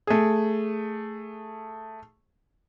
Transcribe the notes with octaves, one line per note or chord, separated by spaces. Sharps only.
A3 G#4